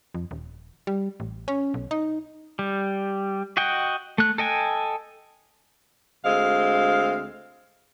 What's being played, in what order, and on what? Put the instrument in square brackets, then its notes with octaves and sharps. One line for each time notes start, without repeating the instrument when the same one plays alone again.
[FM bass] F2
D#1
G3
A1
C#4
B1
D#4
[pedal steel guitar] G3
F#4 D#5 F#5 G5
A3 F#6
A4 D#5 G5 G#5
[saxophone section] D2 G#3 C4 F5